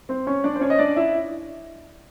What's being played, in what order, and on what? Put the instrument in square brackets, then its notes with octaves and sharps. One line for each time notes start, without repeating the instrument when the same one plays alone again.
[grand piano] C4 C5
C#4 C#5
D4 D5
C5
C#4 C#5
D#5
D4 D5
E4 E5